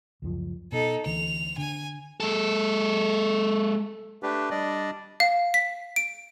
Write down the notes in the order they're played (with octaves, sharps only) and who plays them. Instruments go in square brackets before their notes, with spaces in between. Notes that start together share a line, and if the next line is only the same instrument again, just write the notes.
[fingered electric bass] C#2 F#2 F3
[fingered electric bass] B2 [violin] D#4 A4
[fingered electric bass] D2 E3 [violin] F7
[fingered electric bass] D3 [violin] G#5
[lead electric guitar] G#3 A4
[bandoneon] A3 D4 G4 B4
G3 D4 D5 D#5
[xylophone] F5
B6
D7